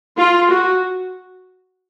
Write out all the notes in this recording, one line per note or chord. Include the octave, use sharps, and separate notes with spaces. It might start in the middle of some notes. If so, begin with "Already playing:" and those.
F4
F#4